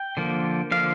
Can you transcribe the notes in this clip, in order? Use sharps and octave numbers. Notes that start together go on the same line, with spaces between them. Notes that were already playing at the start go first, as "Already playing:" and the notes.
Already playing: G5
D3 F3 A#3
D3 F3 A#3 F5